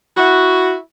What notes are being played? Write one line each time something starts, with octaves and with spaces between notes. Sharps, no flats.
E4 F#4